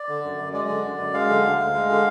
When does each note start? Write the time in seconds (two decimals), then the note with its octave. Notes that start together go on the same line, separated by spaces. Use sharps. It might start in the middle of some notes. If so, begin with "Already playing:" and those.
Already playing: D5
0.09 D3
0.23 F#2
0.38 F#2
0.53 G#3 D5
0.69 D3
0.84 F#2
0.99 F#2
1.14 G#3 F5
1.29 D3
1.44 D2
1.59 D2
1.75 G#3
1.89 D3